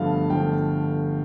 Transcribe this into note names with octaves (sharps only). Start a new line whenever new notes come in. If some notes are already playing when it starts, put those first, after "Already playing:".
Already playing: G1 G2 F3 A3 F5
G1 G2 F3 A3 G5